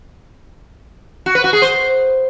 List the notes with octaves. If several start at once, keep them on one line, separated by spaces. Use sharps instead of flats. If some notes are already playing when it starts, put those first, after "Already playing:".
F#4
B4
F#4
G#4
C5